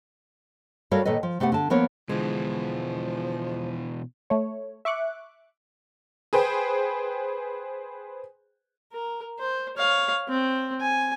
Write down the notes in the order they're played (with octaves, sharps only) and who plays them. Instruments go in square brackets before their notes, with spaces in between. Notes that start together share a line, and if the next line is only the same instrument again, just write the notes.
[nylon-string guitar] G3 F#4 A4 A#4 C#5 F5
A#2 D#3 A4 B4 D#5
F3
C3 A3 B3 G4 F#5
D3 A5
F3 A#3 B3 A#4 C#5
[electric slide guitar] B2 E3 [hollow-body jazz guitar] D3 G#3 [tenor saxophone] F3
[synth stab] A3 C#5
E5 C#6 D6 F#6
[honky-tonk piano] G#4 B4 C5 G5
[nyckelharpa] A#4
C5
C#5 F5
C4
G#5